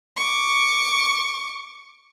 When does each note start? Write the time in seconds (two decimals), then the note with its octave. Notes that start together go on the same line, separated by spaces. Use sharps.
0.17 C#6 D6